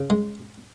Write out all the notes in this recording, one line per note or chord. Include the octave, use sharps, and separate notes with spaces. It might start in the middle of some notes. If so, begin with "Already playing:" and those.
Already playing: C#3
G#3